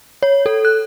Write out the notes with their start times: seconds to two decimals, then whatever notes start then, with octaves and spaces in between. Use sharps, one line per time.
0.23 C#5
0.46 A4
0.65 F#6